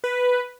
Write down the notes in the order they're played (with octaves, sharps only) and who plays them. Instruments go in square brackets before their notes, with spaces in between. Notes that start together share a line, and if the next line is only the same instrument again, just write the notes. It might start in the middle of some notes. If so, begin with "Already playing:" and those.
[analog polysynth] B4